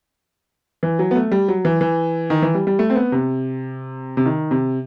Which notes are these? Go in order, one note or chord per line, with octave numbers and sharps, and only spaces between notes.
E3
F#3
B3
A3
G3
F#3
E3
E3
D#3
E3
G3
G3
A3
C4
B3
C3
C3
D#3
C3